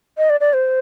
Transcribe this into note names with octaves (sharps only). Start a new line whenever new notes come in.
D#5
D5
D5
C5